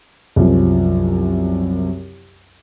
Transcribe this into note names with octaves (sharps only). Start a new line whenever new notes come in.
C2 F#2 F3